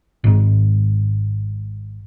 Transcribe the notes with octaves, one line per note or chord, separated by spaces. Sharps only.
G#1 G#2